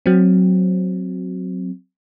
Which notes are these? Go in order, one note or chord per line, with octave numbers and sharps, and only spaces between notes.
F#3 C4